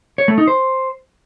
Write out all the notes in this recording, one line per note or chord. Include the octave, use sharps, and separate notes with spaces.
C#5
A3
D#4
C5